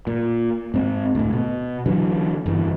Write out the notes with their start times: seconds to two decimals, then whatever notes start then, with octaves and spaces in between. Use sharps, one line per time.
0.07 A#2
0.74 G#2 C4
1.15 D2 A2
1.33 B2
1.86 D3 E3 F#3
2.46 G1 G2 E3